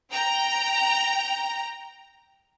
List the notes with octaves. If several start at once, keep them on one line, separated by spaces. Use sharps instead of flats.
G5 A#5